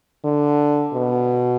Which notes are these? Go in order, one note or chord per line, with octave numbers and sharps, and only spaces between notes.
D3
B2